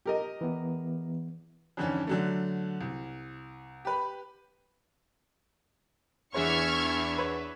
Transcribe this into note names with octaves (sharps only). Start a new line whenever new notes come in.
G4 A#4 D#5
E3 B3
F2 G#2 D3 E3 C#4
D3 F#3 A3
C2
G4 B4 B5
E2 E3 D4 C#5 E5 C#6 F6 G#6
B4 C#5